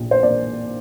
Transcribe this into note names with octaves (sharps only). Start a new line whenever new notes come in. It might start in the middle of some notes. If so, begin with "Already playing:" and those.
Already playing: A#1
C5
A#3 D5